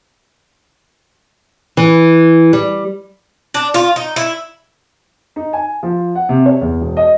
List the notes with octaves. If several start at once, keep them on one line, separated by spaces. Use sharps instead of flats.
E3
G3
D4
F4
D#4
E4
D#4
G#5
F3
F#5
C3
C#5
E2
E1
D#5